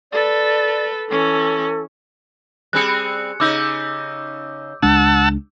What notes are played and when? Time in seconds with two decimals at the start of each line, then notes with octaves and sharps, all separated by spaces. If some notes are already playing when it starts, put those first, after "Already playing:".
0.12 A4 B4 D5
1.09 E3 C#4 A4
2.73 G3 C4 G#4 F#6 C#7
3.40 C#3 D#4 D6 E6 G6
4.83 C#2 G#3 D4 F#5 A5 E6